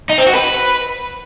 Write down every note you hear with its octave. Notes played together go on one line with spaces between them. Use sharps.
D#4
C4
F#4
B4